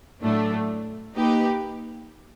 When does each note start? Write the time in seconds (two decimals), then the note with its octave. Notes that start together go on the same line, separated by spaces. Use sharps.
0.20 A2 F#3 A3 D4
1.13 A#3 D#4 G4 B4